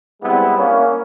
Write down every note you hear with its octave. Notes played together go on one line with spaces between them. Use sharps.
G3 G#3 B3 C4 E4
A#3 C#4